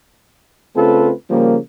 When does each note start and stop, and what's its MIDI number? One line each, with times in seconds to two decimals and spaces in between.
0.76 1.11 49
0.76 1.11 57
0.76 1.11 60
0.76 1.11 65
0.76 1.11 69
0.76 1.11 71
1.30 1.56 49
1.30 1.56 53
1.30 1.56 55
1.30 1.56 58